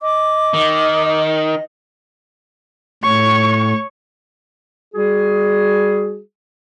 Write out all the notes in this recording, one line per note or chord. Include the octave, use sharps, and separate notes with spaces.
D#5 D6
D#3
A2 C#5 C#6
G3 F#4 G#4